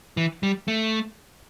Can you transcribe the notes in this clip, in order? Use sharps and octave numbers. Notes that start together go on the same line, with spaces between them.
E3
G3
A3